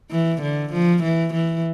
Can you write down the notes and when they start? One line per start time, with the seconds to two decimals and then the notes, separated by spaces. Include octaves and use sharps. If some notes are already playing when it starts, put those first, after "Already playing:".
0.11 E3
0.42 D3
0.73 F3
1.03 E3
1.34 E3